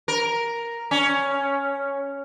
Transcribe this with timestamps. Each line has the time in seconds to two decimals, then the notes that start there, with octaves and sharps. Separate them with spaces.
0.08 A#4
0.91 C#4